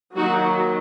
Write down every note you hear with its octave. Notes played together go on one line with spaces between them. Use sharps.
D#3 F#3 A#3 D#4 F#4